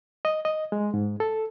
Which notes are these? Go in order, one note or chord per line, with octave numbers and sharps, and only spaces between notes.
D#5
D#5
G#3
G#2
A4